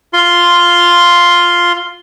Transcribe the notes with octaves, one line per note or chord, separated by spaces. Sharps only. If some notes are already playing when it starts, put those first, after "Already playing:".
F4 C6